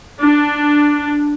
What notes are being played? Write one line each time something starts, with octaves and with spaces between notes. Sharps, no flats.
D4